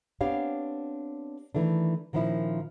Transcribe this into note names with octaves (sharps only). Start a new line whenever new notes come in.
B3 C4 D4 G4 C#5 F5
D#3 E3 A3 D4
A#2 D#3 F3 C#4 E4